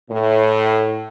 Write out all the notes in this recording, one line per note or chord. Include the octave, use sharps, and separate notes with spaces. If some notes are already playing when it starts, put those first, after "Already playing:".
A2